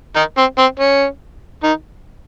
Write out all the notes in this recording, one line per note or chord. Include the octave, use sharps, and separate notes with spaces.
D#3 D#4
C4
C4
C#4
D#3 D#4